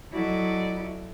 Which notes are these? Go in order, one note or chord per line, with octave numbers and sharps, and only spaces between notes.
F#3 E4 F#4 A4 D5 D#5